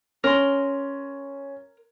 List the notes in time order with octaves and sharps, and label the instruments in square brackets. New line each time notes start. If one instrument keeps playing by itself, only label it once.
[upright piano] C#4 [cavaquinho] A#4 C6